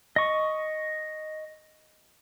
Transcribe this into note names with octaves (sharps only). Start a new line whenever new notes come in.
D#5 C#6